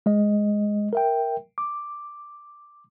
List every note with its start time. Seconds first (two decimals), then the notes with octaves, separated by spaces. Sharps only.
0.06 G#3 D#5
0.93 A#4 E5 G5
1.58 D6